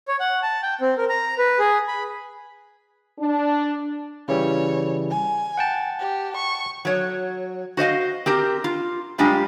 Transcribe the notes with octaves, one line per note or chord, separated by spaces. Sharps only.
C#5
F#5
A5
G5
C4
A#4
A#5
B4
G#4
B5
D4
C#3 E3 G3 C#5
G#5
F#5 G5 A5
G4
C#6
F#3 C#5
F#4 C5 D#5 F5
C4 G4 A#4
F4
F#2 G3 G#3 D4 F4 G4